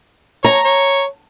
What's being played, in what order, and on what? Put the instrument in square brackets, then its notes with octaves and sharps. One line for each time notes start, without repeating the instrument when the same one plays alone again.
[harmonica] C#5 [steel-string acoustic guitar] A#5
[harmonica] C#5